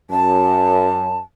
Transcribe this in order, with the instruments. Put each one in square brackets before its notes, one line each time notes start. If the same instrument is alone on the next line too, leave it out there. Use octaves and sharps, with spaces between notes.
[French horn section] F#2 [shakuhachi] A5